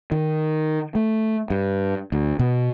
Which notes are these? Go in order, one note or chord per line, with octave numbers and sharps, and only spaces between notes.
D#3
A3
G2
D2
B2